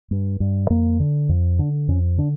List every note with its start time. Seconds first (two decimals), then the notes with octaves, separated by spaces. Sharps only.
0.11 G2
0.40 G2
0.70 F2 A#3
1.00 D3
1.29 F2
1.59 D3 D4
1.88 F2 C#4
2.18 D3 D4